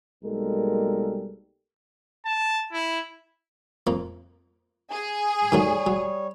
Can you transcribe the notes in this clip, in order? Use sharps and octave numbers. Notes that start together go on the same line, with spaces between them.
B1 G3 G#3 A#3 A4 A#4
A5
E4
F2 A#3
G#4
D#3 F#3 G3 A3 C#5
F#3